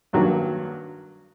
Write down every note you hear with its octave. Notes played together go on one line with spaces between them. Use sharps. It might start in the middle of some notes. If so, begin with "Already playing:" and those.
G2 D#3 F#3 A#3 F#4